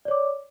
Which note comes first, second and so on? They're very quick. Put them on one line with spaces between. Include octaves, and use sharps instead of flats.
D5 C#5 D6